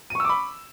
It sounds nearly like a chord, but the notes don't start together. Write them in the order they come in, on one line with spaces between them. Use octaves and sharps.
D#7 C#6 E6 D6 B5